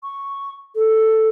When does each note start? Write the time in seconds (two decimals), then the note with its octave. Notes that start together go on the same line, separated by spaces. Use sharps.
0.03 C#6
0.75 A4